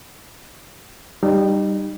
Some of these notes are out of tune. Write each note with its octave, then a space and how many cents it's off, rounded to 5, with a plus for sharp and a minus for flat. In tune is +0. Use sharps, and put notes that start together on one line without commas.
G3 +0 D#4 -25